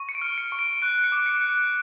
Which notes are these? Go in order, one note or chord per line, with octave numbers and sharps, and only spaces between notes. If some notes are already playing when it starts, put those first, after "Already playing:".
Already playing: C#6
C#7
D7
F6
C#7
C#6 C#7
D7
F#6 D7
C#7
D6
C#7
F#6
D7